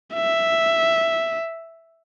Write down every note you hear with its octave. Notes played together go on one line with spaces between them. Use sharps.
E5